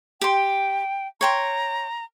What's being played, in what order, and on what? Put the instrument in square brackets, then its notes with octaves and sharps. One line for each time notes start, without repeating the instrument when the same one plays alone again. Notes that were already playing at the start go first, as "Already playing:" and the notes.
[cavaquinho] G4 C6 [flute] G5
[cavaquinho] C#5 G5 C6 [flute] A#5